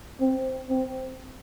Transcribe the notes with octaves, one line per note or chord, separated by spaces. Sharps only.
C4
C4